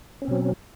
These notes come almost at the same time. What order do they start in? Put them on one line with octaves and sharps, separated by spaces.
C#4 C4 B2 F#3